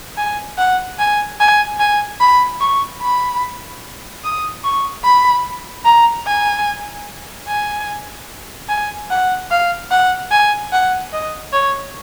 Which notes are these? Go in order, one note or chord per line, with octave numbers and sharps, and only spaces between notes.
G#5
F#5
G#5
G#5
G#5
B5
C#6
B5
D#6
C#6
B5
A#5
G#5
G#5
G#5
F#5
F5
F#5
G#5
F#5
D#5
C#5